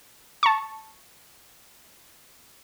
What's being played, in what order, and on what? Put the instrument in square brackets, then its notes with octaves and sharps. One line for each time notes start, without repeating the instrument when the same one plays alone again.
[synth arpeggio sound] A5 C#6